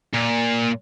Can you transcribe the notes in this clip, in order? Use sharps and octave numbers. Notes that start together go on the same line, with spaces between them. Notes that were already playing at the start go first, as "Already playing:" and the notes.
A#2